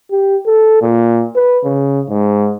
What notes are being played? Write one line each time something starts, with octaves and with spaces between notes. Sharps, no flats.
G4
A4
A#2
B4
C#3
G#2